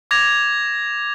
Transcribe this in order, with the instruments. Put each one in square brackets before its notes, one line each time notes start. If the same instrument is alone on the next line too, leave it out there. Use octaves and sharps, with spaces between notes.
[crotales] D6 G#6 A#6 F7